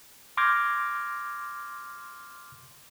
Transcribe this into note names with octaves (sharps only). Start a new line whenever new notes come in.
C6 D6 F6 G6 G#6 A#6